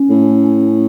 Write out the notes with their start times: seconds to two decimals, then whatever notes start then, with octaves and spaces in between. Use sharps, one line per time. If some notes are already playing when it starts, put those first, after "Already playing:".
Already playing: C#4
0.10 A2